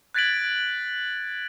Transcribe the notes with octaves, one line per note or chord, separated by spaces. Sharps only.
F#6 G#6 A6 B6 D7 F#7